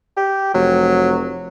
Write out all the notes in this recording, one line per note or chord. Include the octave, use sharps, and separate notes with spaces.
G4
F1 F#3